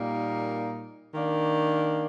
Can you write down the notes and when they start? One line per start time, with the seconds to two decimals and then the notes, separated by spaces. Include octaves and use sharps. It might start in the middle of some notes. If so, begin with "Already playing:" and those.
Already playing: A#2 G3 A#3 D#4
1.14 D#3 A#3 D4